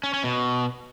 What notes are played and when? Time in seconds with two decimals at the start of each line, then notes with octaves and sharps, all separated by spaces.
0.04 C#4
0.14 C#4
0.24 B2